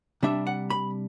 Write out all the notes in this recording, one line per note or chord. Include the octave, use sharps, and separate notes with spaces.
C3 G3 D4 E5
F#5
B5